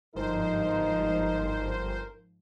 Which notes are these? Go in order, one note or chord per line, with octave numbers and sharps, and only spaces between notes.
G1 G#2 F3 D#4 A#4 C5